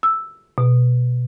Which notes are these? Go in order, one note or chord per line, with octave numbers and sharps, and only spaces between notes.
E6
B2